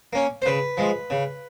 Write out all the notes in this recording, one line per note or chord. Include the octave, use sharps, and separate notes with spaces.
A#3 C#4
C5
C#3 B4
F3 G#3
C#3